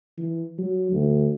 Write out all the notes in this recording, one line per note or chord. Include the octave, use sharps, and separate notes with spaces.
E3
F#3
D2